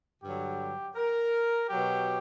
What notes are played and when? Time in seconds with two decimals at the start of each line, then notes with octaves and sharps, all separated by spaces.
0.22 G2 D3 F#3 G4
0.95 A#4
1.69 B2 F#3 G4